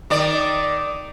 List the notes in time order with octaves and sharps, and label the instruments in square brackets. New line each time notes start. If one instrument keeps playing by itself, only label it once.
[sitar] D#3 D5